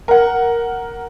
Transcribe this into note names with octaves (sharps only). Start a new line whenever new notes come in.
A#4 F#5